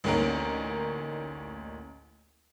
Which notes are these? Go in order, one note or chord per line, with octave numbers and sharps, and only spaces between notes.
A1 D2 A#3 C#4 D#4 A#4